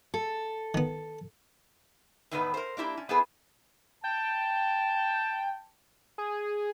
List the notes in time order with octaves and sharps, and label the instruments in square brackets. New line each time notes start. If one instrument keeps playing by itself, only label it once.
[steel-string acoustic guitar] A4
[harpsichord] D#3 B3
[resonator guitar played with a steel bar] E2 A2 D#3 A3 B3 B4
A#4 C5
A#3 D4 E4 G4
C#4
B3 C4 E4 G#4 B4
[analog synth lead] G5 [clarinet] A5
[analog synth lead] G#4